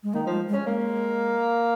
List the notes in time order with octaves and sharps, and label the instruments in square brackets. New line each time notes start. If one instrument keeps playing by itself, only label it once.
[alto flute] G#3
[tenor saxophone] D#3 [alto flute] A#3
[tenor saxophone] F3 [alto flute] G#3
[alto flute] G#3
[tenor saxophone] C#4
[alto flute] G#3 [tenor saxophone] A#3